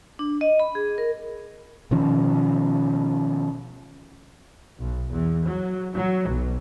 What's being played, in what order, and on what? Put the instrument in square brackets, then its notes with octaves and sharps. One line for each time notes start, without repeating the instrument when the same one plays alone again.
[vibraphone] D4
D#5
B5
G#4
A#4
[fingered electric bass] B2 D#3 F3 C#4
[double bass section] B1
E2
F#3
F#3
B1